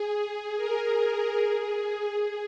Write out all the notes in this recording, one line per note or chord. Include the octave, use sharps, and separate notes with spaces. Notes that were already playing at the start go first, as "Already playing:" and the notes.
Already playing: G#4
A#4
G#4
G#4